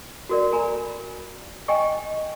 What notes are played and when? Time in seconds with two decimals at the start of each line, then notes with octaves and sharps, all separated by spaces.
0.29 F#4 A#4 D5
0.52 A#4 G#5 A#5 B5
1.68 D#5 G5 G#5 C#6